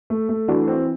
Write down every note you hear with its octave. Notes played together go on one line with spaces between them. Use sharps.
A3
A3
E3 D4 F#4
C4